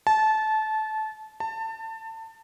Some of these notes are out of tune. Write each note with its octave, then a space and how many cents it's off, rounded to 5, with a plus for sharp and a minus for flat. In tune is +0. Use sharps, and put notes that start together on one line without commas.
A5 -20
A5 +25